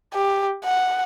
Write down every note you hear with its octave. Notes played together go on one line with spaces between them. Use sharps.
G4
F#5